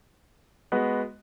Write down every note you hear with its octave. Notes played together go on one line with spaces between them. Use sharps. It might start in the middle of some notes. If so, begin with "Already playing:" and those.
G#3 B3 F#4 B4 D#5